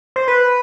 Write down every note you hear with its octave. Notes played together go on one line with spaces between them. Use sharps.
C5
B4